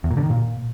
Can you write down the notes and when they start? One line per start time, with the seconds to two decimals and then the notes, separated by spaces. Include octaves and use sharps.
0.04 E2
0.11 A#2
0.17 D3
0.24 D#3
0.30 A#2